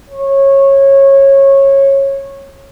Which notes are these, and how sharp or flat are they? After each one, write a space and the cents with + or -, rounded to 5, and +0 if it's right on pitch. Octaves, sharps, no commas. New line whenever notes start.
C#5 -20